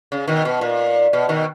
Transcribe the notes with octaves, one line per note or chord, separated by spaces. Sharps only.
C#3
B2 D#3
B2
A#2
B2
B2 D#3